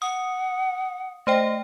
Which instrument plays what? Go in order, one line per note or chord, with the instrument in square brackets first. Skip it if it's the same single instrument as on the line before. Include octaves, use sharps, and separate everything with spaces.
[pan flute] F#5 [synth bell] D#6
[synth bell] A3 C5 G5 [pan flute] D#5